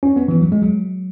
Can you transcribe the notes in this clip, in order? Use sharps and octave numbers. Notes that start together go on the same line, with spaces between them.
C#4
B3
E3
F#3
G#3
F#3